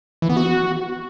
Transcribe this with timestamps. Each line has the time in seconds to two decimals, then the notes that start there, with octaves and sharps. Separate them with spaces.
0.22 E3
0.29 B3
0.37 F#4